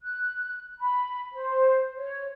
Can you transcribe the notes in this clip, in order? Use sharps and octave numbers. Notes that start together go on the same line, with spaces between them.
F#6
B5
C5
C#5